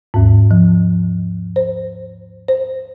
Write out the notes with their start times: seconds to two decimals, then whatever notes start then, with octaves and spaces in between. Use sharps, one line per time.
0.14 D#2 G#2
0.51 F3
1.56 C5
2.48 C5